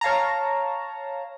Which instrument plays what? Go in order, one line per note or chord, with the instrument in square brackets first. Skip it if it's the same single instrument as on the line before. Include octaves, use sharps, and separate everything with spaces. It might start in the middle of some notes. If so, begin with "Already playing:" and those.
[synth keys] C#5 F5 A5 A#5